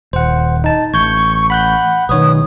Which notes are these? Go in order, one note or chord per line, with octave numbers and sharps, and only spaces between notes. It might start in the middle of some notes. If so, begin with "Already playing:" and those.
D#1 C5 F#5
D#4 A5
A1 C#6 G6 G#6
F#5 B5 F#6 G6
B1 D#3 B4 C#5 D#6